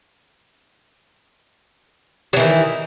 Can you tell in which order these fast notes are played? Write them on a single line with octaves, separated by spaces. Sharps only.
F#3 E3 D#3